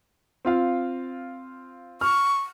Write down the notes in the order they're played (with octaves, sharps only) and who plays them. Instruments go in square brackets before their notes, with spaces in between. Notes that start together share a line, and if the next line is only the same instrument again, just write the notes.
[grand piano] C4 F4 F5
[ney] C#6 [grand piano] F6